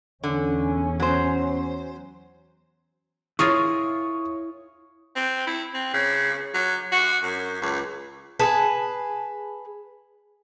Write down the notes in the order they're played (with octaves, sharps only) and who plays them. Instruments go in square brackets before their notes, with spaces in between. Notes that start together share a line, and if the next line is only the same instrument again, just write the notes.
[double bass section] E2 C#4 [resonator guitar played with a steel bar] D3
[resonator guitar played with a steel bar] F#3 C5
[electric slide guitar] E4 C#5 [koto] F4 G#4 A#4 [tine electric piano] C#6 D#6
[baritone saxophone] C4
E4
C4
C#3
F#3
F#4
F#2
C#2
[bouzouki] G#4 B4 A5